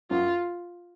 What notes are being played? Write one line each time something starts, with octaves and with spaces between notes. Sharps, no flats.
F#2 F4